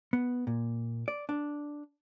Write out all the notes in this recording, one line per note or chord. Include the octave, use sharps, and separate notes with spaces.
B3
A#2
D5
D4